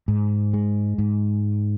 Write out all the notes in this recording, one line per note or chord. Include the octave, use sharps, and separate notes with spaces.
G#2
G#3
G#2